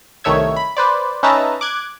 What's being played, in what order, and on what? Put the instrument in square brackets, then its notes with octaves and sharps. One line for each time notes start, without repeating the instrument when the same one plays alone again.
[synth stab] C2 D#3 A3 C#5 E5 G#6
B5
B4 C5 D5
C#4 D#4 B4 E5 A5 A#5
D6 F#6 G#6